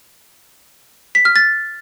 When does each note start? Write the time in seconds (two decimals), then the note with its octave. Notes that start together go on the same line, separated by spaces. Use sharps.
1.15 B6
1.25 F6
1.36 A6